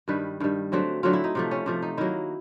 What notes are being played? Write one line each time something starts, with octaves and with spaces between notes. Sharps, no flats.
G2 D#3 G3 B4
G2 D#3 G3
D3 F#3 A3 C4
D3 F#3 A3 C4 F4
E4
D#4
C3 F3 A3
C#4
C3 F3 A3
D#4
D#3 F#3 A#3 E4